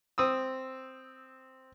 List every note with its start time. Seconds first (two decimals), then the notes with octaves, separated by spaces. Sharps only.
0.18 C4 D#6 E6